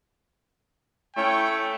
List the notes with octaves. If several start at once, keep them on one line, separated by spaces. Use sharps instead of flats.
A3 C#4 E4 C#5 G5